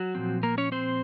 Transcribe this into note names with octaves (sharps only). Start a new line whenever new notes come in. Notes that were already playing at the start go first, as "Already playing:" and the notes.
Already playing: F#3 F#4
A#2 F3 C4
A#3 A#4
C#4 C#5
C4 C5